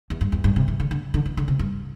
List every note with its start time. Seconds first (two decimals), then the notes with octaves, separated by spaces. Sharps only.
0.10 E2
0.21 G2
0.32 E2
0.44 G2
0.56 C3
0.68 E3
0.80 D3
0.91 D3
1.14 D3
1.25 E3
1.37 D3
1.48 C3
1.59 G2